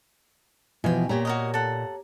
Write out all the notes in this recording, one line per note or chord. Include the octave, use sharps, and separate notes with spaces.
B2 E3 F3 G5 G#5
A#2 G4 C#5 A#5
F#4 A#4 D#5
A4 F#5